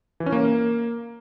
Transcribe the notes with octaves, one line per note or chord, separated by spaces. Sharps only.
E3
C#4
A#3